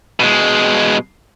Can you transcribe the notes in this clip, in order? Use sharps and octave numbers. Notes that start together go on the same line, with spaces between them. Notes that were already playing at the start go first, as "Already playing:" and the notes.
B2 G#3